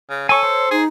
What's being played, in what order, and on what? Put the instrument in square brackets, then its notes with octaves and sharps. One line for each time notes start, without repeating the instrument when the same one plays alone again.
[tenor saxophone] C#3
[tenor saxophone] A4 [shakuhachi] C#5 [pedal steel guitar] G#5 C#6
[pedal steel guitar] C5
[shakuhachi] D#4 [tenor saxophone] G#4